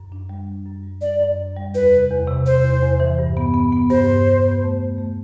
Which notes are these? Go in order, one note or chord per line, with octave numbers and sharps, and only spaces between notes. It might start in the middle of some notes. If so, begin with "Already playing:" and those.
Already playing: F#2
D4
G3
G3
F#2
G3
D4 D5
F#2
F#2
G3
E2 B4
C3
E2
C3
C3 C5
E2
E2
E3
G2
B3
B3
B3
G2 C5
G2
G2
B3
A3
A3
A3